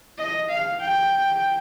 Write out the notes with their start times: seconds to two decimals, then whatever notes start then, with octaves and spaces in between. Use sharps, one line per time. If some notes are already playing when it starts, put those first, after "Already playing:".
0.18 D#5
0.49 F5
0.80 G5